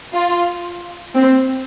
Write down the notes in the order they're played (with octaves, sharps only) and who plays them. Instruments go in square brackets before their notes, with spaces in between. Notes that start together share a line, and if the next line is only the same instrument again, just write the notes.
[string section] F4
C4